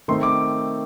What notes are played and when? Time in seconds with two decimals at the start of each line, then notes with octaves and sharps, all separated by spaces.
0.08 D#3 A3 C4 C6
0.23 D6